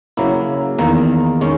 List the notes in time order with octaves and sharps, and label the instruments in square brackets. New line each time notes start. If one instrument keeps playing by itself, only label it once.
[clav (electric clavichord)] C#3 F#3 A#3 E4
E2 D#3 A#3
D#3 G#3 C#4